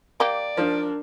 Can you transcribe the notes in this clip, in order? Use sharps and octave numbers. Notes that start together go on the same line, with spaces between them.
A#3 G4 D5
F3 D4 A#4